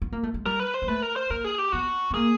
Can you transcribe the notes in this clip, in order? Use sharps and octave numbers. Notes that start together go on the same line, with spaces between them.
B3
A#3
A3
G#3
G3 A#4
B4
C5
A#3
A3 B4
A#4
C5
A#3 A#4
G#4
G4
B3 F#4
B3
A#3 G#4